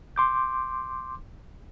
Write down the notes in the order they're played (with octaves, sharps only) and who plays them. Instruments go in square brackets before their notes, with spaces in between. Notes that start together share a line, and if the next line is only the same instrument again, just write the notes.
[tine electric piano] C6 D6 G6